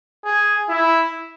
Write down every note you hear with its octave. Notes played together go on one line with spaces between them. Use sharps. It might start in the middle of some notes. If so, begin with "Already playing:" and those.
G#4
E4